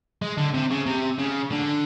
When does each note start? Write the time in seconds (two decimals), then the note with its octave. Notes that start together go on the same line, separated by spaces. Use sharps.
0.22 G#3
0.38 D3
0.54 C3
0.70 C#3
0.86 C3
1.18 C#3
1.51 D3